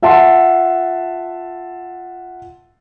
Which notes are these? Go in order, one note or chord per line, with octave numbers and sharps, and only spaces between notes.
F4 E5 F#5 A5 C6